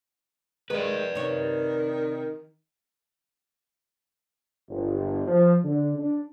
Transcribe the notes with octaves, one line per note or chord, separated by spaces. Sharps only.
D#3 G#3 B4 D5
C3 D#3 C#5
G1
F3
D3
D4